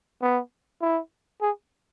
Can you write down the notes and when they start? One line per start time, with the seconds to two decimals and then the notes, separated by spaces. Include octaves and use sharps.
0.22 B3
0.81 E4
1.42 G#4